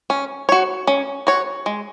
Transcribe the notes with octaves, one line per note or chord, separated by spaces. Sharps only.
C#4
F#4 C#5
C#4
F#4 C#5
G#3